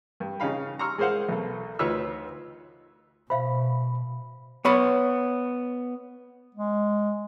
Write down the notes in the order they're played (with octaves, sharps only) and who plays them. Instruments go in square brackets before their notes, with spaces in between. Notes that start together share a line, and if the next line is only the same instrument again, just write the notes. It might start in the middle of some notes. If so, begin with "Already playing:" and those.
[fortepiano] G2
C#3 C#4 D#4 F5 B5
A#5 C6 C#6 E6 F6
G#3 G#4 A#4 C5 F5 F#5
B1 B2 A4
D2 D#4 F4 B4 C#5 E6
[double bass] B2 [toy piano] C5 E5 F5 [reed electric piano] B5
[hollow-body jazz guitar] B3 C#5 B5
[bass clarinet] G#3